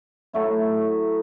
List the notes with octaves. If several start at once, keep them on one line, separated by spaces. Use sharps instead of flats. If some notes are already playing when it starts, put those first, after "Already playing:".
F#3 A3 E4